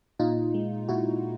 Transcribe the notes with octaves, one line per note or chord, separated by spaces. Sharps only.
A#2 D#4 F4
G#3
A#2 E4 F#4